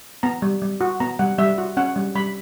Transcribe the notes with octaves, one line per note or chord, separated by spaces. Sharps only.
B3 A#5
G3
G3
F#4
B3 A#5
G3 F#5
G3 E5
F#4
C#4 F#5
G3
G3 B5